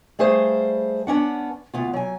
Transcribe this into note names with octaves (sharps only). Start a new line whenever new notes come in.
G3 A3 G#4 B4 C5 F5
B3 C#4 D4 F#5
D2 B3 F4
F#3 G#5